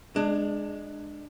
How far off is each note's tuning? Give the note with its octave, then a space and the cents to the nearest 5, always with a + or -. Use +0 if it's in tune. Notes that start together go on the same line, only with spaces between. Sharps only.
G#3 +0 D4 +20